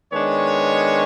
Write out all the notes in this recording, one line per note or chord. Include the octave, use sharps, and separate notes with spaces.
D#3 G#3 B3 D4 C#5